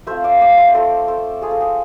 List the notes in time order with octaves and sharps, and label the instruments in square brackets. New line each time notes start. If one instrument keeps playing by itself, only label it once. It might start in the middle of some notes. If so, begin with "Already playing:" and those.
[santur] A3 C4 F4 C5 E5
D5 F5
D5 F5
C5 E5
A3 C4 F4 A4 C5
A4 C5
A3 C4 F4 G#4
A4
G#4